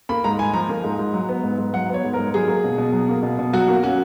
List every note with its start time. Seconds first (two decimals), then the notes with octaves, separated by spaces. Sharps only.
0.09 A#3 B5
0.24 G#2 A#5
0.39 G#2 G#5
0.54 F3 A#5
0.69 A#3
0.84 G#2
0.99 G#2
1.14 F#3
1.29 B3
1.44 G#2
1.58 G#2
1.73 F#3 F#5
1.89 B3 C#5
2.04 G#2
2.14 A#4
2.19 G#2
2.34 F#3 G#4
2.48 A#3
2.64 B2
2.78 B2
2.93 F#3
3.09 A#3
3.23 B2
3.39 B2
3.53 F#3 F#4
3.68 A#3
3.83 C#4 F#4